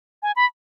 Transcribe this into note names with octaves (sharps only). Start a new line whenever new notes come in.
G#5
B5